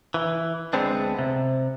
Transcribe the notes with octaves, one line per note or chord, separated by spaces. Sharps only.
E3
D2 G#3 B3 C4 D4
C3